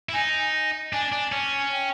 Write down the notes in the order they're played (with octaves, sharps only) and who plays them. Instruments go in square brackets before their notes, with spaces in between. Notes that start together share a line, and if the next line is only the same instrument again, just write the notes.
[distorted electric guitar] E4
[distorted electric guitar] D#4 [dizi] G#5
[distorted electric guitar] D4 [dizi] G#5
[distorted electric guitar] D4
C#4
[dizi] G5